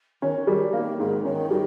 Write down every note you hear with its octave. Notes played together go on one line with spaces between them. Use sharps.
D#3 C#4
D#3 G3
D#3 A#3
G#2 D#3
D#3 C#4
D#3 G3